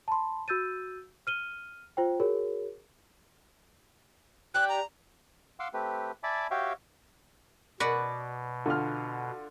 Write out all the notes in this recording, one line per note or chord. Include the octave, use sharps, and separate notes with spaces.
A5 B5 C6
F#4 E6 G6 A6 D#7
F6 D#7 G7
F4 C5 G5
F#4 G#4 A#4 C#5
D4 G4 F#6
A#5
F5 F#5 C6 D6 E6
A3 C4 G4 B4
D5 E5 G#5 A5 B5 D6
F#4 G4 C#5 E5 F5 G5
B2 F#4 B4 D5
D3 F4 F6